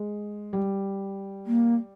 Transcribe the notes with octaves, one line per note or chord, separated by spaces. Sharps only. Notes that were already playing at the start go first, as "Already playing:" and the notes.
Already playing: G#3
G3
A#3